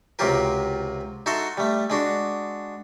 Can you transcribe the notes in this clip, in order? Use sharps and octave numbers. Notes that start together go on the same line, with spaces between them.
C#2 C3 F#3 F4 G4 A#4
D#4 F#4 A4 E5 F#5 C6
G3 A3
G#3 D4 F#4